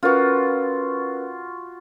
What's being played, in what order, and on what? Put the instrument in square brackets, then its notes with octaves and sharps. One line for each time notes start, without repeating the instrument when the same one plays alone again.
[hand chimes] C#4 A#4 B4 [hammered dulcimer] F4 F#4